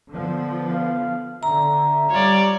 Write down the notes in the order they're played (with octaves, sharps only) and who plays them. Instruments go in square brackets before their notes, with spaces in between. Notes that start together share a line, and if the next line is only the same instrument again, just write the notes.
[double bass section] D3 F3 B3
[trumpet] F5
[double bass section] D3 [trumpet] E5 [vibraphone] A#5
[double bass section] G3 [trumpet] F4 [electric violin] C#5 D5